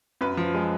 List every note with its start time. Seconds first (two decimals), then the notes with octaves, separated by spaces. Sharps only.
0.21 F#2 B4
0.37 F3
0.55 G#3